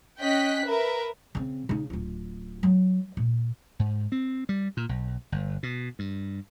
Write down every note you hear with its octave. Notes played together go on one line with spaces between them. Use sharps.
C#4 D#5 G5 F#6 B6
A#4 B4 E5
C#3 C4
C#3 D#4
D1 F4
F#3
A#2
G#2
C4
G3
A#2
B1
G1
B2
G2